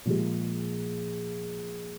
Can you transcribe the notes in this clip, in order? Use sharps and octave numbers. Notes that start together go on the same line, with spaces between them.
A#2 F3 G#3